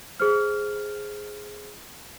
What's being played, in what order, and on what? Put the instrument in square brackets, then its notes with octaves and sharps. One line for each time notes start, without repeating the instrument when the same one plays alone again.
[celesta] G#4 C5 F6